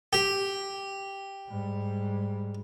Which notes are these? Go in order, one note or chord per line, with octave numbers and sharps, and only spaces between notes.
G4
G#2 G3